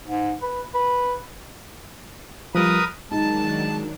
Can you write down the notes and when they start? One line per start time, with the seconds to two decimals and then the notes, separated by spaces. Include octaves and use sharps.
0.07 G#2
0.42 B4
0.74 B4
2.55 F3 G3 A#4 B4 D#6
3.11 D#3 F#3 G#3 D4 D#4 A5